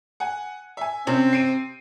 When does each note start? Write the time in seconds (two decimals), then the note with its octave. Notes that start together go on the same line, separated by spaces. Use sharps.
0.20 F#5 G#5
0.77 E5 G#5
1.07 C3 C4 C#4
1.33 C7 D7 D#7